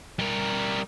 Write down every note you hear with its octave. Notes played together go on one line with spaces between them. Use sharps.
G3 A#4